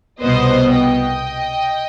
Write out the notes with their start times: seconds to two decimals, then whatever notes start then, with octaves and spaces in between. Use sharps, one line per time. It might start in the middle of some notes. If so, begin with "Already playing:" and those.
0.21 C2 B2 B3 C5 D#5
0.75 D#5 G5